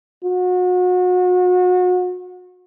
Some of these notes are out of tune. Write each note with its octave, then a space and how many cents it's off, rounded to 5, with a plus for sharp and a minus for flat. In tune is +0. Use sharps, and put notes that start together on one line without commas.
F#4 -35